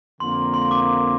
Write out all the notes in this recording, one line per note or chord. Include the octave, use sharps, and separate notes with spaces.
F2 D3 A#3 C6
C6
D6